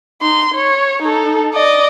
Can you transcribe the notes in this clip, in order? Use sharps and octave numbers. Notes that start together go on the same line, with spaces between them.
D#4 C6
C#5
D#4 A4
D5 D#5